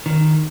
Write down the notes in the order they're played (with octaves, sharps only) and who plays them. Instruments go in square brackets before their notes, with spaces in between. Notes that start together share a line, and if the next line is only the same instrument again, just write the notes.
[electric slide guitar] D#3